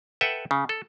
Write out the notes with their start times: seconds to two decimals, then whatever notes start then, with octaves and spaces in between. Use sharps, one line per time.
0.21 A4 B4 E5 F#5 G5
0.51 C#3
0.69 A4